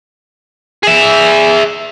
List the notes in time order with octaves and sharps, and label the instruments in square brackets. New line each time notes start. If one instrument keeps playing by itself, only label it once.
[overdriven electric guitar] G#4 E5